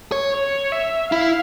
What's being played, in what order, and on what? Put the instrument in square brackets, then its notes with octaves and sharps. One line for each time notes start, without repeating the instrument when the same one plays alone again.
[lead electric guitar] C#5
[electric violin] C#5
E5
[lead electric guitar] E4 [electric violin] F5